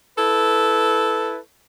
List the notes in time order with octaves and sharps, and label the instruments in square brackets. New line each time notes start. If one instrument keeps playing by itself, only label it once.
[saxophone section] E4 A4 B4